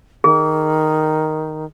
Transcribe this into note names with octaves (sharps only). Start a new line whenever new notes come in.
D#3 G#4